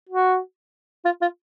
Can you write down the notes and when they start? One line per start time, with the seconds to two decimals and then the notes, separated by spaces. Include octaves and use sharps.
0.09 F#4
1.05 F4
1.21 F4